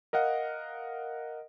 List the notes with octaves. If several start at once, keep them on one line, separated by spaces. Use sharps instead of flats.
A#4 D#5 F5 F#5